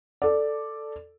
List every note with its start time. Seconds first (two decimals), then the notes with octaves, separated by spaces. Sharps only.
0.22 A4 D5